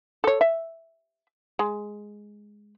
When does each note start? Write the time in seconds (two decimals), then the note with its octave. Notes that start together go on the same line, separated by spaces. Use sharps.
0.24 A4 C#5
0.41 E5
1.59 G#3